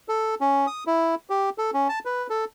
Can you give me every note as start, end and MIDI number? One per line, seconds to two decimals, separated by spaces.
0.08 0.35 69
0.41 0.66 61
0.67 0.84 87
0.87 1.15 64
1.30 1.50 67
1.58 1.71 69
1.74 1.88 61
1.89 1.99 81
2.05 2.27 71
2.30 2.45 69